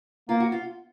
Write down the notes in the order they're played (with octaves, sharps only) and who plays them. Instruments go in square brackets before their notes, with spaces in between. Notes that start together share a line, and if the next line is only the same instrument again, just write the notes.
[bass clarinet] A#3 [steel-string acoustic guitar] F4
[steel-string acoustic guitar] F#4
F4